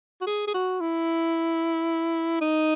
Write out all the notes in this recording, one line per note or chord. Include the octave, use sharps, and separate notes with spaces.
F#4
G#4
G#4
F#4
E4
D#4